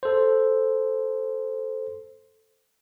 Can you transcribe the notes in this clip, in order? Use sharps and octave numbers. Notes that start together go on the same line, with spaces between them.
A4 C5